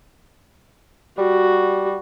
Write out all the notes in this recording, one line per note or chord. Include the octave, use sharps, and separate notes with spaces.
G3 F#4